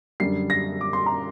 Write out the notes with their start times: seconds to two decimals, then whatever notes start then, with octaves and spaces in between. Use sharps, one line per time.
0.20 F#2 D3 G3 C7
0.50 A#6
0.81 D6
0.93 C6
1.06 A#5